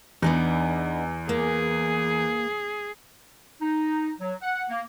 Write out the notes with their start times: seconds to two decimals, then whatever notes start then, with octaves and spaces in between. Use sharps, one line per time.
0.22 E2 B3 D4 D#4
1.29 A#3 G#4
3.62 D#4
4.20 F#3
4.42 F#5
4.70 A#3